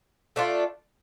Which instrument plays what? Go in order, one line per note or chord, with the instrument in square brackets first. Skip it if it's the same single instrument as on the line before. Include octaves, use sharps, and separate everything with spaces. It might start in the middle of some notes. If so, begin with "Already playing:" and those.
[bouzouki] A3 D4 F4